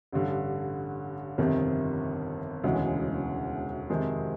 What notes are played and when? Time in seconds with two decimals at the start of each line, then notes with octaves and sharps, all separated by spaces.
0.13 A1 G2 D3
1.38 G1 F2 C3 D#3
2.64 E1 D2 C#3 E3 G#3
3.90 F2 C3 D#3 G#3 C4